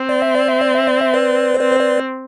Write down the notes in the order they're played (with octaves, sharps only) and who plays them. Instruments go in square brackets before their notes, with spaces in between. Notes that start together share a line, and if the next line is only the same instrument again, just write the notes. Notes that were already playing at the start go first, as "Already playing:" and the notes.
Already playing: [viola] C4
[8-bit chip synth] D5
E5
D5
E5
D5
E5
D5
E5
B4 D5
C5
[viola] C4 [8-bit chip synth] B4 D5
[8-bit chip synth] C5
B4 D5